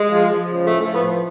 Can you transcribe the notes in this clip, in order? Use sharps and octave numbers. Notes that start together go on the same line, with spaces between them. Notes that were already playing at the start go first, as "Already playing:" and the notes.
Already playing: G#3
F3
F3
C#3
A2 A3
A3
F3
B3
F3